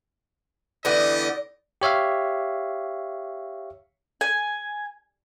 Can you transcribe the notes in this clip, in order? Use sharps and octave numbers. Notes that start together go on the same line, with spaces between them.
D3 E3 B3 G4 D5 D#5
G4 C#5 E5 F5
G#5